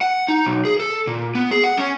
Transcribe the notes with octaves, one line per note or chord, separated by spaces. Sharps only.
F#5
D#4
B1
G#4
A4
A#2
B3
G#4
F#5
C#4